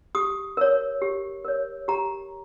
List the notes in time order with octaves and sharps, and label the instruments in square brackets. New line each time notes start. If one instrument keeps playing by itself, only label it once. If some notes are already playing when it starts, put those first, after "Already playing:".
[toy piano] G4 D#6
A#4 C#5
G4
A#4 C#5
G4 A#5